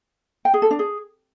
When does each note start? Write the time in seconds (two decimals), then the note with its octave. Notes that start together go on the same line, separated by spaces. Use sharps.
0.45 G5
0.54 G#4
0.62 A4
0.71 D4
0.79 G#4